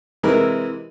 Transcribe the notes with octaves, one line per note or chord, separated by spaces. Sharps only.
C3 E3 G#3 E4 A#4